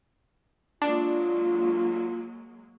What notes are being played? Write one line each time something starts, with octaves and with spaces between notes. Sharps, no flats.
F#3 G#3 A#3 D4 F4